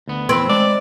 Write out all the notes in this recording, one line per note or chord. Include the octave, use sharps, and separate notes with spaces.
D2 B3
E2 C4 B4 B5
G#3 D5